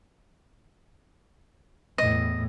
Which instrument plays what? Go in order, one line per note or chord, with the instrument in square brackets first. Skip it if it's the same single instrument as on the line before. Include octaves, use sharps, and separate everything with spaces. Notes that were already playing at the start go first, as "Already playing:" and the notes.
[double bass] E2 A2 [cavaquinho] D#5